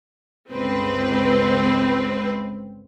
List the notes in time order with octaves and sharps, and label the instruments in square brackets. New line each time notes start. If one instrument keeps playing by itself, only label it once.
[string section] G1 C#2 C4 B4